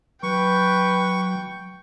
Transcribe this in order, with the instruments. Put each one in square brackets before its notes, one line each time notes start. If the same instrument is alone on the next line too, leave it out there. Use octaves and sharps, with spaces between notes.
[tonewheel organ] F#3 [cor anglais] B4 [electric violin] G5 [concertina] C#6